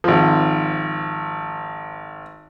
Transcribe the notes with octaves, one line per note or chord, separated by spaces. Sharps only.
G#1 F3